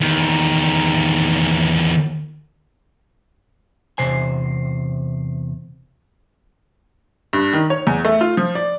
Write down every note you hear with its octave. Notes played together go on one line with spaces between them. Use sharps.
E2 D#3
E2 C3 C5 G#5
G2
D#3
C#5
E2
A3
F4
F3
D5